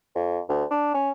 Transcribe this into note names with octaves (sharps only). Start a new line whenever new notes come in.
F2
D2
D4
C#4